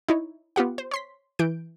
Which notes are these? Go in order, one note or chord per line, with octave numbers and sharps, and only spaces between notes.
D#4 E4 C#5
B3 F4 G4 F#5
C5
C#5 C6 B6
E3 G6 D7